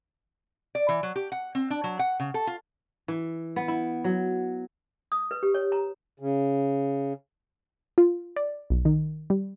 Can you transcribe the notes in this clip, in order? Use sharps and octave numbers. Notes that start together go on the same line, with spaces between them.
D5
E3
F#3
G4
F#5
C4
D4
F#3
F#5
C#3
A4
F4
E3
B3
E4
F#3
D#6
B4
G4
C#5
A#5
C#3
F4
D5
B1
D#3
G3